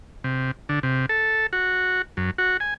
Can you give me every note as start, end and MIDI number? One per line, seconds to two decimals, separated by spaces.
0.24 0.51 48
0.69 0.79 50
0.83 1.06 48
1.09 1.47 69
1.53 2.02 66
2.17 2.31 42
2.38 2.57 66
2.60 2.74 80